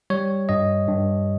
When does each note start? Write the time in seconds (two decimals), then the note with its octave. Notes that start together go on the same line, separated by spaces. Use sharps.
0.10 G3 C#5
0.49 G2 D#5
0.89 G2